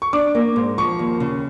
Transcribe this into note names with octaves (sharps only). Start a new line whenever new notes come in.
C#6
D4 D6
A#3
G#2
F3 C#6
D#2
C#3